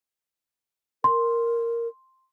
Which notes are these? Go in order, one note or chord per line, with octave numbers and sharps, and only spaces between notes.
A#4 C6